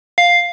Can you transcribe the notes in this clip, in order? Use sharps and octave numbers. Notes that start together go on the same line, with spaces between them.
F5